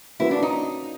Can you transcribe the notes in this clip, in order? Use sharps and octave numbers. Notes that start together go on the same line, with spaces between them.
F3 A#3 C#4 E4 F#4 B4
D4
D#4